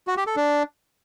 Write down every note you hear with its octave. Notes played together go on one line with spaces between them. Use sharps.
F#4
G4
A4
D4